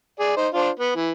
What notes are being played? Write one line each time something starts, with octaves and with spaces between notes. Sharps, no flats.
G#4 D5
D#4 C5
D4 F4 C5
B3
E3